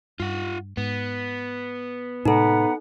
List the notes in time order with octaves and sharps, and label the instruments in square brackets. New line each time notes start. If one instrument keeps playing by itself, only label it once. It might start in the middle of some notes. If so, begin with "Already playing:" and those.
[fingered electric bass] G2 [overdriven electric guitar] F4 F#5
[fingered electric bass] G#2 [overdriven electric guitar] B3
[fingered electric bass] A2 C3 G#3 [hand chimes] D#4 A4 [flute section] B4 F#5 A#5